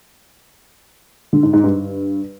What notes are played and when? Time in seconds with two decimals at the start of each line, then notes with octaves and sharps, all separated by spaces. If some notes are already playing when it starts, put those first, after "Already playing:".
1.33 D3
1.43 G#2
1.53 G#2
1.64 G2